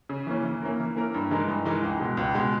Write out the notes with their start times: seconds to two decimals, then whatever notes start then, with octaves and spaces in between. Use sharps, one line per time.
0.09 C#3
0.27 E3 A#3 C#4 E4
0.44 E3
0.62 A#3 C#4 E4 A#4
0.80 E3
0.96 A#3 C#4 E4 A#4
1.14 G2
1.31 E3 G#3 D#4 A#4
1.49 G2
1.65 E3 G#3 D#4 A#4
1.82 C#2
2.00 B2 G#3
2.17 C#2
2.34 B2 G#3